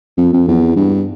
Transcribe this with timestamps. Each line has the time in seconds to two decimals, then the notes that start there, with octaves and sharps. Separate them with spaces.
0.17 F2
0.33 F2
0.48 E2
0.76 G2